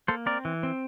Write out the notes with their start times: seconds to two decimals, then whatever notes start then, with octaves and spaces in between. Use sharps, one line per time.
0.08 A#3 A4 C5
0.26 C4 A#4 D5
0.45 E3
0.63 C4